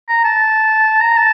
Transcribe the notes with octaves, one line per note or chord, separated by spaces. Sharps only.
A#5
A5
A#5
A5